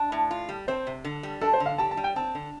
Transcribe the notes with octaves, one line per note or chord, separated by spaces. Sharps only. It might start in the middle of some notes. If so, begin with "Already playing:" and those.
Already playing: D4
A2
F4
G3
C4 C5
C3
D3
G3
D4 A4
C5
D3
F5
G4 A5
A5
G3
G5
C4 A5
D3